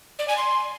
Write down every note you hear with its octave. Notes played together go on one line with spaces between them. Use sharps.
D5
G#5
C6